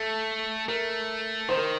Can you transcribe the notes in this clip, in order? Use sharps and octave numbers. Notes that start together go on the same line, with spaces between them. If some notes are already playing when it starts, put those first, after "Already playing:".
Already playing: A3 A4
A3 A#4
D#3 C5
A#4